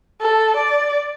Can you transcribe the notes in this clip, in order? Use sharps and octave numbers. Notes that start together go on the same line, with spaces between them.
A4
D5